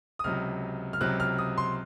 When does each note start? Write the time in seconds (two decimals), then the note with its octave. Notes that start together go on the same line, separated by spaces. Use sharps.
0.19 D#6
0.24 C#2 C3 F#3 F6
0.93 F6
1.00 C#2 C3 F#3 F#6
1.20 F6
1.39 D#6
1.58 C6